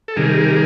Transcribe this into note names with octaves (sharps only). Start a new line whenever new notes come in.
A4
C3 D#3 G3 G#4 A#4